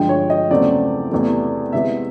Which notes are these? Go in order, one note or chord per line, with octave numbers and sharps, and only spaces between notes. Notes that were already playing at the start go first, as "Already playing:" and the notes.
Already playing: G2 D3 F3 G#3 G5
C#5
D#5
E2 C#3 F#3 A3 C4 D5
E2 C3 E3 A3
C3 E3 G#3 B3 E5